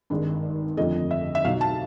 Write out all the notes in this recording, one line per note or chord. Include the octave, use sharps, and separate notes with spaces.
G#1 G2 D#3 G#3
G1 F2 D3 F3 A3 D#5
E5
E5
B1 B2 F#3 F5
A5